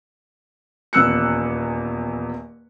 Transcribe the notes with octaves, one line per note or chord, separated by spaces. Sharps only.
D#1 E2 E6 F#6 C#7